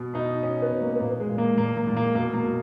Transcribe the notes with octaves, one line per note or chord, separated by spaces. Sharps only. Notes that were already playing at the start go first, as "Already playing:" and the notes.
Already playing: B2
B2 D#4
B2 C#4
B3
B2
A#3
B3
A#2 A#3
G#3
A#2
A#3
A#2 A#3
A#3
A#2
A#3
B2 A#3
A#3
B2